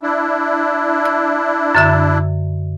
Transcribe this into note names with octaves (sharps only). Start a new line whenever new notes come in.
D4 E4
E6
F#2 D3 E5